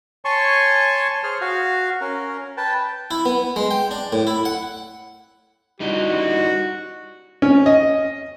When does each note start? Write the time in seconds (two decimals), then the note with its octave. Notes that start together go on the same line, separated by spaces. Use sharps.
0.25 C#5 G#5 A5 C6 C#6
1.24 G#4 C5 C#5 C6 F6
1.41 F#4 F5
2.01 C#4 A#4
2.57 B4 G5 A5
3.11 E4
3.25 B3
3.56 G#3
3.71 G5
3.91 D4
4.13 A2
4.27 E4
4.45 F#5
5.80 G3 D#4 E4 F#4
7.42 C#4
7.66 D#5